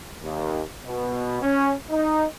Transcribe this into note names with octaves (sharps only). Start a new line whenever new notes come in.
D#2
B2
C#4
D#4